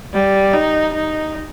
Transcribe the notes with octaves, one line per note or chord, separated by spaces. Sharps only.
G3
D#4
D#4